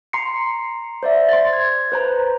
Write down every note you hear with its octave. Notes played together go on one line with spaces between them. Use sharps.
A#5 C6 C7 C#7
C5 D5 E5
C6 A6
G#6
B4 C5 A#5